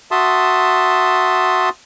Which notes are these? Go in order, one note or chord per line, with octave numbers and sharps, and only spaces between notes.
F#4 E5 A5 C6 D#6